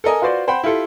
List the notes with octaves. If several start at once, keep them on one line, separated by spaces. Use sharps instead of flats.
A4 A#4 D#5 G#5
F4 F#4 B4 C5 D5
C5 F#5 G5 B5
E4 F4 G4 A4